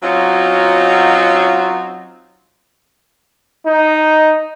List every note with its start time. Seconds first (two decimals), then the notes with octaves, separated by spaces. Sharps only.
0.03 F#3 C4 C#4 D#4 F4 F#4
3.66 D#4